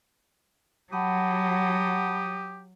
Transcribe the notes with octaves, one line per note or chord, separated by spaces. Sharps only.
F#3 G4 F#5 A5 B5 D#6